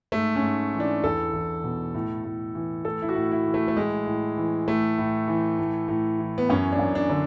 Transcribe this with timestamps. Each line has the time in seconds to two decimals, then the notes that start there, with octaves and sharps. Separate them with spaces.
0.12 G#2 A3
0.36 C#4
0.42 G#2
0.74 E3
0.80 D4
1.03 E2 A4
1.33 E2
1.64 B2
1.94 A2
2.24 A2
2.55 E3
2.85 A2 A4
3.02 E4
3.09 F#4
3.15 A2
3.31 E4
3.46 E3
3.54 A3
3.68 A3
3.77 A2 G#3
4.07 A2
4.37 E3
4.67 A2 A3
4.98 A2
5.28 E3
5.58 A2
5.88 A2
6.19 E3
6.38 B3
6.49 F#2 C#4
6.72 D4
6.79 F#2
6.95 D4
7.10 D3